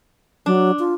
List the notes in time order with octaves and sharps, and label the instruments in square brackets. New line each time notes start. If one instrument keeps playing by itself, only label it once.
[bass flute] F#3 [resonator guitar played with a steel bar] D4
[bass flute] F4